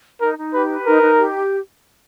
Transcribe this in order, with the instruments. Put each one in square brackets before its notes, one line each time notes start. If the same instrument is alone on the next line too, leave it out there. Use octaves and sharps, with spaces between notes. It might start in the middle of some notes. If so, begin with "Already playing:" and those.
[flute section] D#4 [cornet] A#4
[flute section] D#4
[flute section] G4 [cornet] B4
[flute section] B4
[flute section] D#4 [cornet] A#4
[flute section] D#4
G4